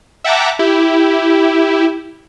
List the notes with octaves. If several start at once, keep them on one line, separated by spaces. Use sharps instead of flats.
E5 F#5 G5 A5 A#5 D6
E4 G4